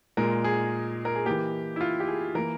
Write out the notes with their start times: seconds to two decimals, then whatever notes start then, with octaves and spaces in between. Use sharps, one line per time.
0.17 A#2 G#3 A#4
0.44 G#4
1.05 A#4
1.15 G#4
1.26 E3 A#3 G4
1.76 E4
1.81 F4
2.00 G4
2.08 G#4
2.35 E3 A#3 A#4